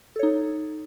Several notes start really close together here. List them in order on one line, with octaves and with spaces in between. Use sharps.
A4 C#5 D#4